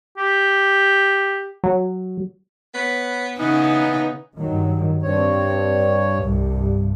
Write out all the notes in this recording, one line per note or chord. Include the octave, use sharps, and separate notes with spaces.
G4
F#3
B3 B4 C#5
C#3 E3 B3 C#4 D#4
G2 D#3 F#3
G2 C4 C#5
C2 G2